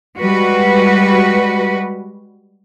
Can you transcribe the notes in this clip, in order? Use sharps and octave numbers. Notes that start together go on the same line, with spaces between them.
G3 G#3 F#4 B4